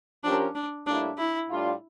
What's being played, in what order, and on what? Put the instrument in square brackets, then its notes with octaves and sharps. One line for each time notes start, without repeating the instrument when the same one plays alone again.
[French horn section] F3 C#4 G4 A#4 [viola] D4
[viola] D4
[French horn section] A2 G3 A#3 E4 [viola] D4
[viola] E4
[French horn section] A2 G3 D4 F4